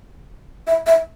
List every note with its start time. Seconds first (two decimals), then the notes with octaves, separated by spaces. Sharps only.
0.67 E5
0.87 E5